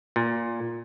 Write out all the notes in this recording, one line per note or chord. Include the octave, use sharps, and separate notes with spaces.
A#2